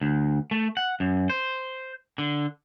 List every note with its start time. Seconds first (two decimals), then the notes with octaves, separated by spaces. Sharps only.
0.01 D2
0.51 A3
0.77 F#5
1.00 F#2
1.30 C5
2.18 D3